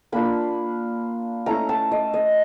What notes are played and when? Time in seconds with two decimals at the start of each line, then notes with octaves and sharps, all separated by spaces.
0.12 A#3 D4 F4 B5
1.46 A3 C#4 E4 A#5
1.69 A5
1.91 D#5
2.14 D#5